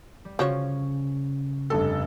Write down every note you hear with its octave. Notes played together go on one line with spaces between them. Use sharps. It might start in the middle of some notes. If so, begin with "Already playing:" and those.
G3
C#3 F3 C#4 F#4 C#5
F1 G2 A4